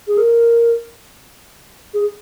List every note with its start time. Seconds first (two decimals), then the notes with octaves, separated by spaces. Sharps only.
0.08 G#4
0.18 A#4
1.94 G#4